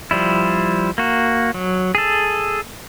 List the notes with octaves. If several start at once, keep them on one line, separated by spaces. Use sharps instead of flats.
F3 G3 E4
A#3 F#4
F#3
G#4 A4